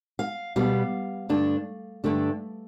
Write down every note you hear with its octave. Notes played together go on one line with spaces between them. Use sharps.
F5
B2 G3 B3 F5
G2 D3 A3 D4
G2 D3 A3 D4